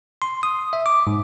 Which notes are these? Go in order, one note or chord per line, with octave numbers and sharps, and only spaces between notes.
C6
D#6
E5
D6
G#2